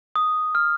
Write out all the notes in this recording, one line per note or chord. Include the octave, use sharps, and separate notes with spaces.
D#6
F6